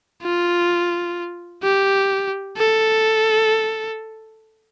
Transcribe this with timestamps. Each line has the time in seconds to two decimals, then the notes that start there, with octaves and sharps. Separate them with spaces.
0.23 F4
1.63 G4
2.57 A4